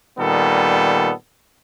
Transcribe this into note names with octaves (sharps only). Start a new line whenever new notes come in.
A#2 D#3 G3 B3 A4